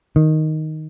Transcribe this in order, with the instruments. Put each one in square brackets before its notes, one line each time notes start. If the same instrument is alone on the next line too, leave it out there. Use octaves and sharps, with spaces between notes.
[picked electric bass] D#3